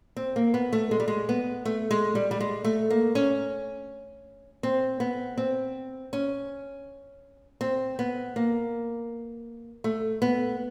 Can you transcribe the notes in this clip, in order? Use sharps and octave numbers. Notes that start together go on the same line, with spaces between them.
C4
A#3
B3
A3
G#3
G3
G#3
B3
A3
G#3
G3
G3
G#3
A3
A#3
C#4
C4
B3
C4
C#4
C4
B3
A#3
A3
B3